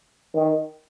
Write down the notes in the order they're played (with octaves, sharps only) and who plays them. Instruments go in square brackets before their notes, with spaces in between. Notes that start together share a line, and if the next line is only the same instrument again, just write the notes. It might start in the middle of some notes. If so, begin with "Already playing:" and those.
[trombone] D#3